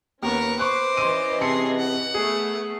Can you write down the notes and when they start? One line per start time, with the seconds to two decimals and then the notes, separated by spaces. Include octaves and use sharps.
0.23 D#2 B3 C#4 A#4 C#6
0.59 B4 C5 C#6 D6 F#6
0.97 E3 C#4 D#5 C6 D#7
1.41 C3 G#4 A5 C6 C#7
1.78 F#5
2.14 A3 B3 G#4